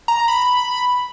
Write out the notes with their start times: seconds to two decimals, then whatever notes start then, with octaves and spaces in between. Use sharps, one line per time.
0.08 A#5
0.28 B5